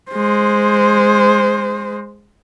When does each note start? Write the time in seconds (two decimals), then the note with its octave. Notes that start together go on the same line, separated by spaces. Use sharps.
0.12 G#3 C5